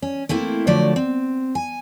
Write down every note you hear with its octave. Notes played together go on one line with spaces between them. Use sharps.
C#4
A3 A#3 C4 E4
D3 F3 F#3 A3 D5
C4
G#5